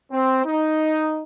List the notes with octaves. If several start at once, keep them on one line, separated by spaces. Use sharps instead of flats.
C4
D#4